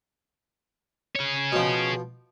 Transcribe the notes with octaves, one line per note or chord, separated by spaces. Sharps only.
G#4 C#5
B2 F3